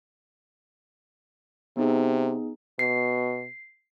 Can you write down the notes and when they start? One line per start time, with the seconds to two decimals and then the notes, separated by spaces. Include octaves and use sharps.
1.77 C3 B3 D#4 G#4
2.79 B2 C7